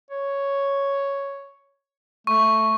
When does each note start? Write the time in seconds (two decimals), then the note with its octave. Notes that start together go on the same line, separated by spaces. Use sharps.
0.11 C#5
2.27 A3 C#6